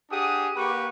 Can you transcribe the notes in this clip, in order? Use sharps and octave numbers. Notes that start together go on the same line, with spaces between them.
D4 G4 G#4 F#5 D#6
A#3 G4 B4 F#5 C#6 D6